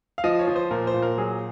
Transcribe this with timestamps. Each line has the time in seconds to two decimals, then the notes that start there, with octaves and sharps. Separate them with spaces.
0.18 F5
0.24 F3 D#5
0.39 C#5
0.48 F3
0.56 C5
0.71 A#2 A#4
0.87 C5
0.94 A#2
1.02 A#4
1.18 F#3 G#4